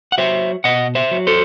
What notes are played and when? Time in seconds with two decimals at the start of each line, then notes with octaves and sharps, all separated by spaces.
0.12 F#5
0.18 F#3 C5 E5
0.64 B2 D#5 F#5
0.95 C5 E5
1.11 F#3
1.27 A4 C5